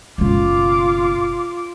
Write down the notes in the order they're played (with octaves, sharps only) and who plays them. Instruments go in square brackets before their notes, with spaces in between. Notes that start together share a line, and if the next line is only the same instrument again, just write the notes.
[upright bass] F#1 B2 [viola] F4 D6